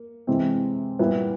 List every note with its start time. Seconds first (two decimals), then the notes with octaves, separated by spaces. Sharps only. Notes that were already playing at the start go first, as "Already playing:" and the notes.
Already playing: A#3
0.27 C3 E3 G#3 C4 E4
0.99 A#2 G3 B3 E4